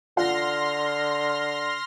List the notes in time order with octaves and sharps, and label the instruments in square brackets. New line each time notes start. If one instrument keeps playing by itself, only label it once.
[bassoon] D3 [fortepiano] F4 F#5 [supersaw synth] C6 F6 A#6